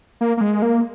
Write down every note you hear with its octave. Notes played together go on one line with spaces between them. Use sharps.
A#3
A#3
G#3
A#3